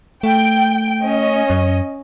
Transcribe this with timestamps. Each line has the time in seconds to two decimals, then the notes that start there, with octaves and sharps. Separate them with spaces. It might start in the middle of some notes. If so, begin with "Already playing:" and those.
0.23 A3 G5
1.04 C#4 D#5
1.50 F#2